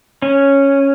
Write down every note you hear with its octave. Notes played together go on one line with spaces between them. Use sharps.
C#4